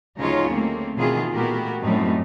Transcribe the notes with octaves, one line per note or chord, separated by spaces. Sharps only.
D2 C#3 F#3 D#4 F4 C#5
A3 A#3 C4
B2 D#3 E3 C4 F4 G#4
A#2 A3 B3 F#4 G4 A#4
F#2 A2 G3 A3 C4 D#4